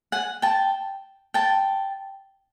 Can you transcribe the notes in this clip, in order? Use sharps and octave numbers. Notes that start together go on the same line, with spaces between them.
F#5 G#5
G5 A5
G5 A5